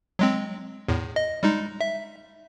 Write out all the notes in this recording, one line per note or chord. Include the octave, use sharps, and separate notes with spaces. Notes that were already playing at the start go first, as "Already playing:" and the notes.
F#3 G#3 C4
E2 A2
D#5
G3 G#3 D#4
E5